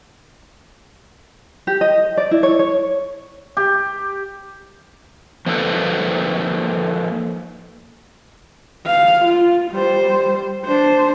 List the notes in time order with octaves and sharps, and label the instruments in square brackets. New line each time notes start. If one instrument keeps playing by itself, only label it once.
[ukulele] G4
D#5
D5
E4
C#5
C#5
[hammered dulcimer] G4
[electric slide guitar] F3 A#3 D#4 A4 B4
[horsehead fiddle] F5
F4
G3 C5
D4 C5